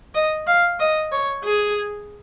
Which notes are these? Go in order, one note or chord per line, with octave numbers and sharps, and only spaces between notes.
D#5
F5
D#5
C#5
G#4